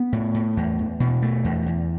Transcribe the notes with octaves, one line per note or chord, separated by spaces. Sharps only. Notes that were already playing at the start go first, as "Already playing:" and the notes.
Already playing: B3
A2
A2
E2
E2
B2
A3
E2
E2